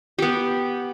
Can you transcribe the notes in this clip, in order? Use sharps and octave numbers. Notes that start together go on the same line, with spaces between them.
B3 G4